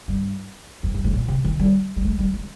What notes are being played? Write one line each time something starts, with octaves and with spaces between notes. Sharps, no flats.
G2
F2
G2
G#2
A#2
C3
D#3
G3
G3
G#3
G3
G#3